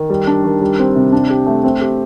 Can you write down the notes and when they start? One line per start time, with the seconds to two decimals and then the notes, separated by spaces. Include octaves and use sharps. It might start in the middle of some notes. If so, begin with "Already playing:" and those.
Already playing: D#3
0.10 G3
0.27 D4
0.44 D#3
0.61 G3
0.79 C4
0.95 C3
1.12 D4
1.30 G4
1.46 A3
1.64 C4
1.81 G4